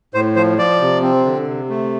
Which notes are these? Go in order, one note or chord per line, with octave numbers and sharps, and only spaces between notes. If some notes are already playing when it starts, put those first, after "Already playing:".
A2 C5
F3 C5
F3 D5
C3
C4
D3
C3
A3